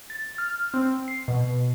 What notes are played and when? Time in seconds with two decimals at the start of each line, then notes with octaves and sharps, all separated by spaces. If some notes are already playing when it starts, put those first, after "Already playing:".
0.10 A6
0.38 F6
0.74 C4
1.08 C7
1.28 B2